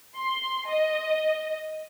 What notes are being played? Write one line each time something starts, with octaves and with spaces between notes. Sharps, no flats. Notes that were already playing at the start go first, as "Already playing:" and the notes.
C6
D#5